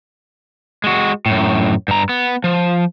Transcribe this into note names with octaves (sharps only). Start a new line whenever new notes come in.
G#3 F#4
F#2 A2
G2 A#5
B3
F3